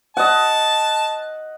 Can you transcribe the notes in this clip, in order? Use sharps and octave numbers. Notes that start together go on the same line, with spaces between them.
D#5 F#5 A5